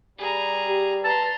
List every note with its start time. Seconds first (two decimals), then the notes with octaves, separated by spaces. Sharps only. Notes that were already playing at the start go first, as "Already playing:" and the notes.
0.18 G3 G#4 A#5
0.68 G4
1.05 B4 A5 A#5 C6